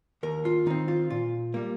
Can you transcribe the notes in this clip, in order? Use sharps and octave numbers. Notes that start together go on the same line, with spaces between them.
D#2 A#4
F4
D#3 C4 D#4
F4
A#2 F4
G3 A#3